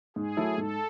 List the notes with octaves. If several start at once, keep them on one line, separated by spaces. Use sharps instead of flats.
G#2 G#4
F#3 A3 E4 A4
G#2 A4